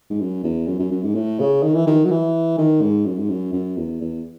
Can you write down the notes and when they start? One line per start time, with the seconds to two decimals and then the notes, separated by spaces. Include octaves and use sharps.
0.10 G#2
0.20 F#2
0.44 E2
0.67 F#2
0.79 F#2
0.91 F#2
1.03 G#2
1.15 A2
1.39 C#3
1.63 D#3
1.75 E3
1.87 D#3
2.05 F#3
2.11 E3
2.58 D#3
2.81 G#2
3.05 F#2
3.18 G#2
3.29 F#2
3.53 F#2
3.77 E2
4.01 E2